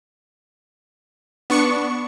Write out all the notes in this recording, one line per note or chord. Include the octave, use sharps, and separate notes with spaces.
B3 D4 C#6 C#7